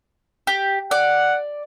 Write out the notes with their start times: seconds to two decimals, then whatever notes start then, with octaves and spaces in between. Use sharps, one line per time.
0.47 G4
0.91 D5 F#5